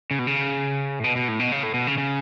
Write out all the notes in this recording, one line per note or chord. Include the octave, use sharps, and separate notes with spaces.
C#3
B2
C#3
A2
B2
B2
A2
B2
C#3
A2
B2
C#3
C#3